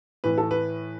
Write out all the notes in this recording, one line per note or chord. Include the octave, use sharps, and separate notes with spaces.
A2 E3 B4
A4
B4